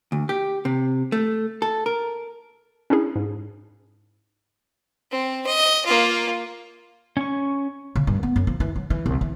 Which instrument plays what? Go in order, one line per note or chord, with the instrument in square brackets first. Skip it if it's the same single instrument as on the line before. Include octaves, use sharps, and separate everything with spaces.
[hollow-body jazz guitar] D2
G4
C3
A3
A4
A#4
[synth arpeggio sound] C#4 D4 E4 G#4
G#2
[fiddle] C4
D#5
A#3 F4
[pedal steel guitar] C#4 C#6
[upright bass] C#3
G2
B3
F#2
F3
E3
F#3
E3
C2
E3